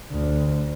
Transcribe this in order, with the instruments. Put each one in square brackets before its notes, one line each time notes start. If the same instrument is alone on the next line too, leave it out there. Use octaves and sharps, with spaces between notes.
[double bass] D2